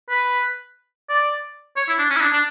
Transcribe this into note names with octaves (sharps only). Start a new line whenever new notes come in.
B4
D5
C#5
E4
D4
C#4
E4
D4
D4